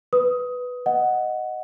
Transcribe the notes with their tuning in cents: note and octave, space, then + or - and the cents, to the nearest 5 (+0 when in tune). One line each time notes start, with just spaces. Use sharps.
B4 +0 D#6 +15
D#5 +0 F#5 +0